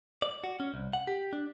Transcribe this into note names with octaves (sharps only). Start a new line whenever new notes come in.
D5
F#4
C#4
C2
F#5
G4
D4